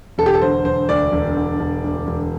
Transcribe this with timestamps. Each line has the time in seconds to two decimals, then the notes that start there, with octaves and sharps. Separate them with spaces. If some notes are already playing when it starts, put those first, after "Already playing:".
0.18 E1 A4
0.26 G4
0.34 A4
0.42 D3 C5
0.65 E1 C5
0.89 D2 D5
1.12 E1
1.37 D3
1.59 E1
1.84 D2
2.07 E1